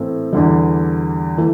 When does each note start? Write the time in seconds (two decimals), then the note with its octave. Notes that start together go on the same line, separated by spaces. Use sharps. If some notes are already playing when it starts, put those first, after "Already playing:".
Already playing: A2 E3 A3 C4
0.33 E2 D3 G3
1.38 E3 A3